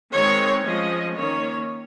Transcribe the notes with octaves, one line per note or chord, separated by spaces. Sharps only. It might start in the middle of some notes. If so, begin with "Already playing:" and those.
D#3 G#3 C4 C#5
F3 G#3 C#4 D#5
D#3 A#3 C#4 C#5